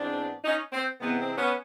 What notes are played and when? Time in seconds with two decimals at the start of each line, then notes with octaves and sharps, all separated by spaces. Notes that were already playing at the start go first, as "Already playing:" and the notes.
Already playing: G#2 E3 G#3 B3 C4 D4
0.44 C#4 D#4
0.73 C4
1.00 C3 E3 G#3 B3
1.19 C4
1.37 B3 C#4